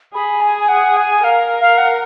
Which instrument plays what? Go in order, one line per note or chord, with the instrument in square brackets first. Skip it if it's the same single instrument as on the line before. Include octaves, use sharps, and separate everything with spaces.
[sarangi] G#4 [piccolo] B5
[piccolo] G#5
F#5
G#5
[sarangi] A#4 [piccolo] F5
[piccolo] F5
F#5